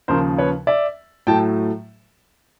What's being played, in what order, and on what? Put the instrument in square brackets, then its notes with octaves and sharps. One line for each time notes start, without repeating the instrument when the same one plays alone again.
[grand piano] D#2 C#3 F3 A#4 C5
B4 C#5
D5 E5
A2 F#3 A3 G5 A5